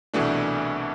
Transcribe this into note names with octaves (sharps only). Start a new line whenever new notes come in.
C2 B2 E3 A3 D4